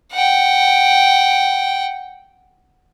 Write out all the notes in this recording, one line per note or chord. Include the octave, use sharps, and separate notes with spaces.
F#5 G5